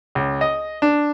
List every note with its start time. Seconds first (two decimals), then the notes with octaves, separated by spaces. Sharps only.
0.15 C#2
0.41 D#5
0.82 D4